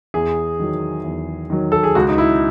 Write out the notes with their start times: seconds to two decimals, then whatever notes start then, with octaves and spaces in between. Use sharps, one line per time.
0.14 E2 G#4
0.59 D#3 F#3
1.04 E2
1.50 D#3 F#3
1.72 A4
1.83 G#4
1.95 C#2 F#4
2.09 D#4
2.18 E4